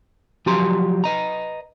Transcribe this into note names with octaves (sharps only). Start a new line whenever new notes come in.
F3 F#3 G4 A#5 C6
B4 D#5 A#5